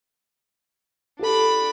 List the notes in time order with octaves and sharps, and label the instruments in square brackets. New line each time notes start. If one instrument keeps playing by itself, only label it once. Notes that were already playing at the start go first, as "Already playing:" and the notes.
[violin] D4 B5 [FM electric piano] F4 G4 A4